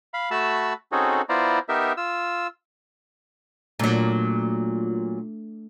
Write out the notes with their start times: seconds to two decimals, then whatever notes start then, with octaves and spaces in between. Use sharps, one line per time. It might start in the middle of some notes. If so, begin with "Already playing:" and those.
0.14 F5 B5
0.31 A3 F#4 A5 B5 E6
0.92 C4 C#4 D#4 F#4 G#4 A4
1.29 B3 E4 F4 C5 D5 A#5
1.69 B3 D#4 G4 A#4 E5
1.97 F4 E6
3.79 A#2 F#3 A3 D4